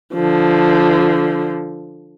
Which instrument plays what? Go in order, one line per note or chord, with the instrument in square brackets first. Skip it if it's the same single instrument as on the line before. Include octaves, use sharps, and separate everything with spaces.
[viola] D3 F3